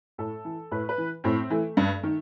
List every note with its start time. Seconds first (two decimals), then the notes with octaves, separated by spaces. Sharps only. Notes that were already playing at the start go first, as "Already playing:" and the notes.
0.18 A2 A4
0.45 E3
0.71 A2 B4
0.89 B4
0.98 E3
1.24 A2 C4
1.50 E3 A3
1.77 G2
2.03 D#3